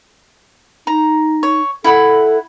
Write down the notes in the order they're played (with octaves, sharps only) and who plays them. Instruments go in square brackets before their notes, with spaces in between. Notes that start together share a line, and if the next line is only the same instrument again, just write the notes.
[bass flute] D#4 [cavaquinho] A#5
[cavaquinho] C#5
[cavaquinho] E4 F#5 B5 [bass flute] A4